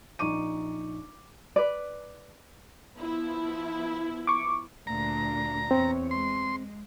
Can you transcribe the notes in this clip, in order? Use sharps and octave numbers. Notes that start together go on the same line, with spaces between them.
A#1 D#4 C#6 D6 D#7
B4 D5
F3 B3 E4
C#6 D6
D2 A#2 D4 A#5
E2 C4 C#5
G#3 C6